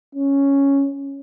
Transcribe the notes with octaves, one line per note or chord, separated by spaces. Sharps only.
C#4